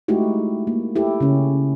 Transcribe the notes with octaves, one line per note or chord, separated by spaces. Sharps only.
G#3 A3 D#4 E4 F#4 G4
A#3
E4 G4 A4
C#3 C#4